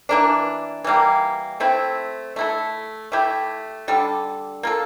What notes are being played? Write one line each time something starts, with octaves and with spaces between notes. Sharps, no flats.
E3 A#3 D4
E3 G3 A#3
A3 C4 E4
A3 E4 A4
A3 E4 G4
D3 G3 D4 A4
A#3 F4 A4